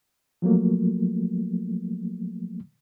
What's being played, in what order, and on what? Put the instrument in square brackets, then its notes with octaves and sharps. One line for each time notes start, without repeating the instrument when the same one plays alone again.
[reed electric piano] F3 F#3 A3 A#3